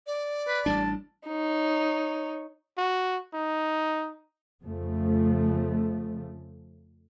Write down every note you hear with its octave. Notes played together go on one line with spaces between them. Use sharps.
D5
B4
A1 G3 D4 A5
D#4 C#5
F#4
D#4
F2 C#3 F3 A3